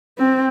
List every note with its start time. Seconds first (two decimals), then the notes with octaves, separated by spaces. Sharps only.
0.19 C4